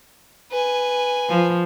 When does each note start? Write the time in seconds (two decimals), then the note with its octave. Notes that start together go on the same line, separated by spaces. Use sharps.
0.52 B4 G#5
1.30 F3